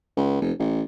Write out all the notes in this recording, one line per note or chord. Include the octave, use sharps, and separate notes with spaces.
C#2
F1
A1